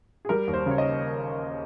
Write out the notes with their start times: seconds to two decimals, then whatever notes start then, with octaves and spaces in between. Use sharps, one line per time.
0.25 G#4
0.29 G3 A#4
0.47 D#2
0.53 C5
0.66 C#3 C#5
0.78 D#5